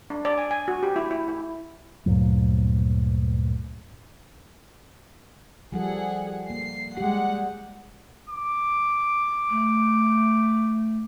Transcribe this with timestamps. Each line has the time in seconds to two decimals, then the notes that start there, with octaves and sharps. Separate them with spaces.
0.10 D4
0.25 D5
0.38 G#5
0.51 G#5
0.68 F#4
0.83 G4
0.96 E4
1.11 E4
1.28 E4
2.06 D2 G2 A#2 F#3
5.72 F3 G3 G#4 A4 F#5
6.50 A#3 C7
6.97 G3 G#3 G4 F#5
8.29 D6
9.50 A3